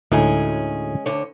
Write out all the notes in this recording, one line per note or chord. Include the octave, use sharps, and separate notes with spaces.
D2 A2 G#3 C#4 D#4 G#4
D2 D3 C#5